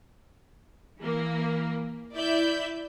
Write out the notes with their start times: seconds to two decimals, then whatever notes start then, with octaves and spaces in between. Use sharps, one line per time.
1.02 E3 A#3
2.13 E4 D5 E5 G6